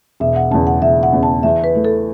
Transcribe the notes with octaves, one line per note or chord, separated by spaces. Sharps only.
E1 E5
F#5
E2 C#3 A5
F#5
E1 E5
F#5
E2 C#3
A5
E2 E5
B4
E3 A3
A4